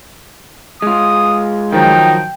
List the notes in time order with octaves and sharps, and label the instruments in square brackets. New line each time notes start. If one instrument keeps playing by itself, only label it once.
[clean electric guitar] G#3 F4 [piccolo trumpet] D#6
[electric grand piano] D#3 F3 F#3 [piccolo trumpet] D#4 [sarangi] G5